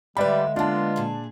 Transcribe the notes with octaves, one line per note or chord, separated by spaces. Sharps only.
D3 G3 G#3 B4 D5 E5 F5 B5
A#3 B3 D4 F4 A5
A#2 G#4